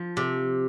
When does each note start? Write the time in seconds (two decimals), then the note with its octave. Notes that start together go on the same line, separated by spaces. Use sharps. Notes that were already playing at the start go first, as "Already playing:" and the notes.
Already playing: F3
0.17 C3